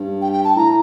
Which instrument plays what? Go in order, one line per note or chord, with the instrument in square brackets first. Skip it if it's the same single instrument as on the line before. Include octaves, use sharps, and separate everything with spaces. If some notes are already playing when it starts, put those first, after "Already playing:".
Already playing: [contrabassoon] G2
[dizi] G5
G5
A5
[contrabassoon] A2 [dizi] A#5